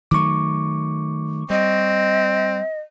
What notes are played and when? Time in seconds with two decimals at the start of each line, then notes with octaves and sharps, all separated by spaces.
0.11 D#3 F#3 A3 C#6 D6
1.50 G3 C4 D#5